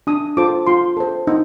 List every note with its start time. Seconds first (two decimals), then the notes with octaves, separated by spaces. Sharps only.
0.07 D4 D#6
0.37 F4 A4 C5 D6
0.67 F4 C6
0.97 A4 C5
1.27 D#4